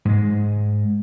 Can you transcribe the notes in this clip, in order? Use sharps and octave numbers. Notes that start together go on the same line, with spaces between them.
G#2 G#3